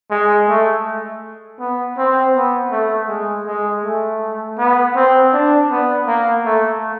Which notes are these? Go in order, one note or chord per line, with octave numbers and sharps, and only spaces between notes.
G#3
A3
B3
C4
B3
A3
G#3
G#3
A3
B3
C4
D4
B3
A#3
A3